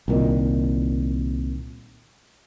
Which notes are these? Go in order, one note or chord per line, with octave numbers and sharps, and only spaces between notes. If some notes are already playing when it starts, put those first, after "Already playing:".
C2 A#2 D#3